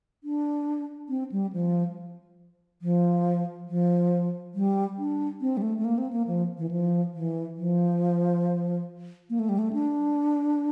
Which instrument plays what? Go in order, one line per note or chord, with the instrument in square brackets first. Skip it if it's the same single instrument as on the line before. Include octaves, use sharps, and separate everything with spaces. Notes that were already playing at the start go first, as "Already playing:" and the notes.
[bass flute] D4
C4
G3
F3
F3
F3
G3
D4
C4
G3
A3
A3
A#3
C4
A#3
F3
E3
F3
E3
F3
A#3
A3
G3
A3
D4